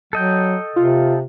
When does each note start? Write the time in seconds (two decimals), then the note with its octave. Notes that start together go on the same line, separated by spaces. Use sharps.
0.13 F#3 A4 D#5 G5
0.76 C3 F4